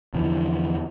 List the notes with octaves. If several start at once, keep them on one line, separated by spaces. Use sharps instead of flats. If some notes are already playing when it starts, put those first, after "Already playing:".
E2 D3 E3 F3